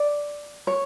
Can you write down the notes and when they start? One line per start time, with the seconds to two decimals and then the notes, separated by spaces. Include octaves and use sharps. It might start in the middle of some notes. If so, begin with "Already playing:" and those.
Already playing: D5
0.67 C#5